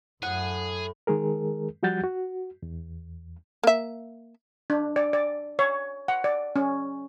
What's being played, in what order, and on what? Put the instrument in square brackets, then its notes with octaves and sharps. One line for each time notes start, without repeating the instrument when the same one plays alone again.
[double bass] F#2 [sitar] A2 [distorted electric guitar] G#4 [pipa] F#5
[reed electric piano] D#3 G#3 G#4 A#4
F3 G3 F#4 F#5 G6 A6
F#4
E2
[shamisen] A#3 E5
[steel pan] D4
D5
D5
C#5
F#5
D5
C#4